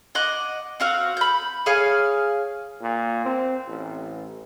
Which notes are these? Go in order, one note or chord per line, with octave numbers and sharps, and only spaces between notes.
D#5 F#5 D6
C4 F#4 F5
B5 G6
G#4 C#5 F5 G#5
A#2
C4
A1